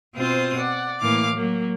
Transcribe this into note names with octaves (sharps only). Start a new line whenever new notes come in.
B2 C4 F4 C5 D#6
D5 F#5
A2 E3 A#3 F5 D6
F#3 A#3